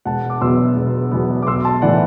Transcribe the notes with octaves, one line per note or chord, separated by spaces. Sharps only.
E1 F#5 A5
D6
E2 B2 F#3 B3 C6 E6
E1
E2 B2 F#3 B3
D6
B1 C6 E6
A5 C6
A2 E3 D5 F#5